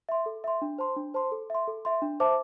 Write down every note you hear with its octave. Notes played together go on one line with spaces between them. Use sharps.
E5 C6
A4
E5 C6
D4
C5 A5 C6
D4
C5 A5 C6
A4
E5 C6
A4
E5 C6
D4
C5 E5 A5 D6